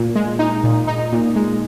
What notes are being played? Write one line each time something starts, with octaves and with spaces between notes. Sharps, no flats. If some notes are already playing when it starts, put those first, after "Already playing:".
Already playing: A#2
G#3
D#4
A#2
D#4
A#2
G#3